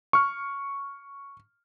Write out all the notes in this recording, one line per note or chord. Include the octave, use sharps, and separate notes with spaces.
C#6 F6